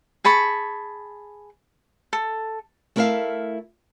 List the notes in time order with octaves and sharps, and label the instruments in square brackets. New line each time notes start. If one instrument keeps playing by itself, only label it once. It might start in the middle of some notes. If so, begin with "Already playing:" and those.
[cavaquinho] G#4 A5 B5 C#6
A4
[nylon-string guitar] A3 E4 A#4 D5 E5 F5